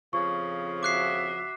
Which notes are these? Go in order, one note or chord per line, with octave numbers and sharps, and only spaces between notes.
F2 C#3 F3 C#6
F#4 E5 D6 F#6 C7